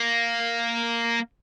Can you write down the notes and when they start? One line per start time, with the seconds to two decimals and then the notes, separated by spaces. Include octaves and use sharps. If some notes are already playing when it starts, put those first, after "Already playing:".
Already playing: A#3